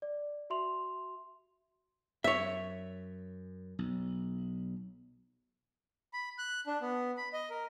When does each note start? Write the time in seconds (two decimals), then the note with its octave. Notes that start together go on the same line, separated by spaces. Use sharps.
0.02 D5
0.50 F#4 E5 C6 F7
2.24 F#2 C#5 E5
3.79 B1
6.14 B5
6.38 F#6
6.67 D4
6.81 B3
7.17 B5
7.33 D#5
7.50 A#4